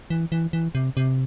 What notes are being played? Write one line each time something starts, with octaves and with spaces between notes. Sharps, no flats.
E3
E3
E3
C3
C3